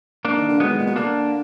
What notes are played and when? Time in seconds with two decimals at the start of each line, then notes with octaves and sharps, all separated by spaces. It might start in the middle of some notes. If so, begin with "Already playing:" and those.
0.25 A#3 D4
0.36 D#3
0.49 D3
0.60 F#3 G#3 B3
0.69 D#3
0.79 A#2
0.86 B2
0.96 D3 A#3 D4